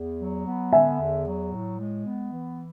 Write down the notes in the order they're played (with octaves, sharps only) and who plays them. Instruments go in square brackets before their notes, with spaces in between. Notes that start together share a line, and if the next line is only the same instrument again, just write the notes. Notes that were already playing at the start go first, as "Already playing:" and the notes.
Already playing: [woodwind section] E2
F#3
B3
[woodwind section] D3 [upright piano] E5 G#5
[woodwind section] E2
F#3
A2
G#3
B3
E3